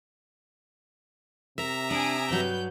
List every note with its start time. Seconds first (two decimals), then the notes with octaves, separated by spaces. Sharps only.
1.58 C3 A#4 E5 A#5
1.91 D4 G#5 D#6 D7
2.29 G2 F#3 B4 G6